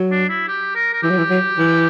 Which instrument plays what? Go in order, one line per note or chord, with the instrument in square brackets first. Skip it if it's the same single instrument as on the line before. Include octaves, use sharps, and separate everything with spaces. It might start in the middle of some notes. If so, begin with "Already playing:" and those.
Already playing: [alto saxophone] F#3
[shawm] D4
E4
G4
A#4
A#4
[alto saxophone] E3 [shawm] G4
[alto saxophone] F#3
E3
F#3
E3